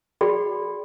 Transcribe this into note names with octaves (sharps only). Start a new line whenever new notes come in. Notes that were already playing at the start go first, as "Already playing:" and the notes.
F#4 G#4 D5 G5 B5